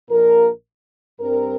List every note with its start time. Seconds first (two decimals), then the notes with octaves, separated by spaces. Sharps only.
0.10 A#1 A#2 F3 A#3 A#4
1.20 G2 G3 C4 A#4